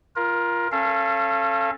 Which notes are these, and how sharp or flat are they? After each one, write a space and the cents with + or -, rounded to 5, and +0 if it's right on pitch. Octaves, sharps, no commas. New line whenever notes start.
F4 -10 A#4 +20
C#4 -30 A4 +0 F5 -30